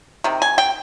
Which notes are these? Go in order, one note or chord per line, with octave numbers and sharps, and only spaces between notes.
C3 D#3
G#5
G5